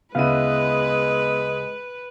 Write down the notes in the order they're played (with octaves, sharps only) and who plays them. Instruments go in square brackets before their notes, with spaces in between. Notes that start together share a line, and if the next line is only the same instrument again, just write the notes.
[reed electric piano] D2 C#3 F5 [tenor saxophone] G#3 [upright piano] B3 E4 D#7 [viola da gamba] B4